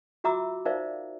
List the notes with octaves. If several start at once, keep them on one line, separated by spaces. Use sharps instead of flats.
F4 F#4 E5 A#5 D6 E6
D#4 A#4 C5 D5 E5 F5